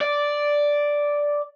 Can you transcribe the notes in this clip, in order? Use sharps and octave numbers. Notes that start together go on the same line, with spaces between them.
D5